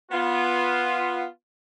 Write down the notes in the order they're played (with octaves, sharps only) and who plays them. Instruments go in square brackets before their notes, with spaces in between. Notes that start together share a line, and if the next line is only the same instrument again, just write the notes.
[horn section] B3 F4